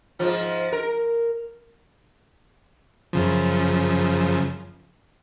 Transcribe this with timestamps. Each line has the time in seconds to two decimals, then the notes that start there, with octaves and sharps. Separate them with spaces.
0.19 G#2 F3
0.72 A#4
3.13 F#2 C#3 F3